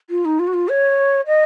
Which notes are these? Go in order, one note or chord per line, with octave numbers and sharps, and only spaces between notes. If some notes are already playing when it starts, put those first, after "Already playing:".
F4
D#4
F4
F#4
F4
C#5
D#5